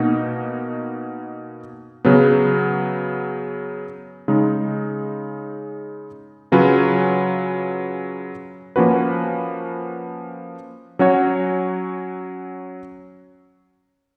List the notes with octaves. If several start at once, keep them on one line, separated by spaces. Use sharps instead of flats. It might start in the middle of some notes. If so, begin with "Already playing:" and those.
Already playing: B2 A#3 D#4 F#4
C#3 F#3 B3
C#3 G#3 D#4
C#3 F#3 C#4 F4 B4
F3 A#3 C#4 F#4 B4
F#3 C#4 F#4 C#5